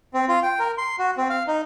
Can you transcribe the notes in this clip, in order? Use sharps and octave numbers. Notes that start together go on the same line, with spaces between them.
C4
F4
G5
A#4
C6
F#4
C4
F5
D#4